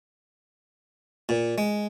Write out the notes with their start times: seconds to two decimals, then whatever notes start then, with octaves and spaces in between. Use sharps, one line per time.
1.29 A#2
1.58 G#3